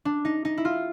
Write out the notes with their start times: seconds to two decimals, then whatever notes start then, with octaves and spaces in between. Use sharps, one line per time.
0.05 D4
0.25 D#4
0.45 D#4
0.58 E4
0.65 F4